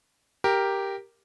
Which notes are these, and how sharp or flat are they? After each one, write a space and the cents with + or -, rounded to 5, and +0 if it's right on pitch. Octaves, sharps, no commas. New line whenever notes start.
G4 +0 A#4 +0